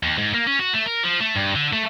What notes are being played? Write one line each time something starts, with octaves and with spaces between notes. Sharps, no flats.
D#2
G#2
A#3
C#4
F#4
A3
A#4
F3
A3
G2
D3
A3